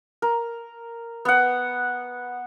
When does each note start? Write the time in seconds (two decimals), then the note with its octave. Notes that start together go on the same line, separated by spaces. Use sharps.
0.22 A#4
1.25 B3 F#5